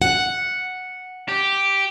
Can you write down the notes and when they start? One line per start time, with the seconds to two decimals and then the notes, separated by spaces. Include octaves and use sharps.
0.02 F#5
1.29 G4